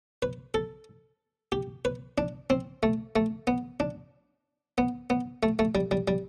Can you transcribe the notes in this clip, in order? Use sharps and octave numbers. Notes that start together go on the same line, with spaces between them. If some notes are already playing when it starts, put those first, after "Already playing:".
B4
A4
G4
B4
D4
C4
A3
A3
B3
D4
B3
B3
A3
A3
G3
G3
G3